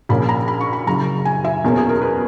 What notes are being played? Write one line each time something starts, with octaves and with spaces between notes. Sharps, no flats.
A#1 A#2 A#3 C#4 B5
A#5
B5
C#6
B5
F#1 F#2 C#3 A#5
G#5
E5
E2 B2 A#3 C#4
G#4
A#4
B4